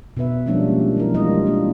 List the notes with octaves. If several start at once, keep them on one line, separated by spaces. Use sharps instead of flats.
B2 B3 B4 E5
F3 G3 G#3 A#3 C#4 D4
E3 F3 A#4
G3 G#3 D4 F4 D#5
E3 A#3 D4 G#4